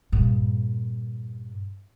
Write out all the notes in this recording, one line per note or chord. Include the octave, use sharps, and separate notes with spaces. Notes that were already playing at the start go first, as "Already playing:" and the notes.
G2 A#2